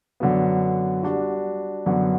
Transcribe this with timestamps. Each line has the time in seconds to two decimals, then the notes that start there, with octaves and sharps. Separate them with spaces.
0.20 F#2 D3 F#3 B3
1.03 G3 D4 F#4
1.86 F#2 D3 F#3 B3